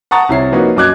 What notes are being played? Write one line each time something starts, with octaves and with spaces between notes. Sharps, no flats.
F#5 A5 A#5 C#6 D#6 A6
C2 C3 E4 C#5 C7
F3 A#3 D#4 F#4 B4 C#5
F#2 D#5 D6 F#6 G#6